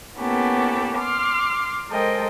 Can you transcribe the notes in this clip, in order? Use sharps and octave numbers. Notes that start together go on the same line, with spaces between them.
A#3 B3 C#4 E4 G4 A4
C6 D6 F6
G#3 A4 A#4 C5 D#5 G5